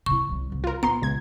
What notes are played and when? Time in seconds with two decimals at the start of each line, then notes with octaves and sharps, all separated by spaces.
0.06 C3 E4 C#6
0.29 C2 G3
0.52 C2
0.64 F4 A#4
0.83 A#1 B3 A#5 C6
1.02 C#2 G#6